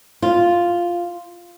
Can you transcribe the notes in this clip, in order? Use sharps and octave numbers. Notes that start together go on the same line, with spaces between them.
F4